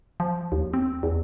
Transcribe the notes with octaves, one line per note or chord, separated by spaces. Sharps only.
F3
D#2
C4
E2